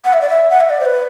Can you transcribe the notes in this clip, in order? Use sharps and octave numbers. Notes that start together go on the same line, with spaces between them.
F#5
E5
D5
E5
F#5
E5
D5
C5
B4